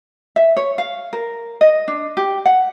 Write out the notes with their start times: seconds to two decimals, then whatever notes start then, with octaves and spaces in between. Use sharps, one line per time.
0.36 E5
0.57 C#5
0.78 F5
1.13 A#4
1.61 D#5
1.88 D4
2.17 G4
2.46 F#5